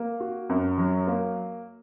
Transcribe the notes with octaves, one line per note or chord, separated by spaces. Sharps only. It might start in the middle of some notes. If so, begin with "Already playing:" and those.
Already playing: A#3
F#4
F#2
F#3
A#3